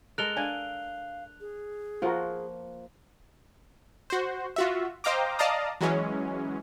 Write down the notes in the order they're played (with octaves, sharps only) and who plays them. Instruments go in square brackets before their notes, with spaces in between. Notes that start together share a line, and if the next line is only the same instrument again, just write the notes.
[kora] G#3 A4 A#4 [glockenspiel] F#6 F7 G7
[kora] D4 [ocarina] F5 [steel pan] G#5
[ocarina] G#4
[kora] F3 A#3 [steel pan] F4 F#4 A#4
[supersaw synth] F#4 C5
F4 F#4 E5
C5 D#5 F5 G5 A#5 D6
D5 D#5 F5 A5 A#5 D#6
E3 F#3 G#3 C#4